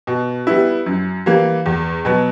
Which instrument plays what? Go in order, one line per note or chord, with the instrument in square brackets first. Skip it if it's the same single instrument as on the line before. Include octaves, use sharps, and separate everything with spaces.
[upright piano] B2
G3 B3 E4
F#2
E3 G3 A#3
E2
B2 F#3 B3